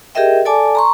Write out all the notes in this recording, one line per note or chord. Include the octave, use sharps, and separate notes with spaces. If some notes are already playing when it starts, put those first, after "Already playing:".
G4 G#4 A#4 D#5 E5 G5
A4 D5 G#5 A5 D6
A#5 C6 C#6